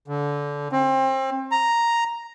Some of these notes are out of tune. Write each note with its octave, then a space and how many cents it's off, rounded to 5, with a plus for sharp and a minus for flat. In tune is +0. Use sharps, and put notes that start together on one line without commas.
D3 -25
C4 +30
A#5 +0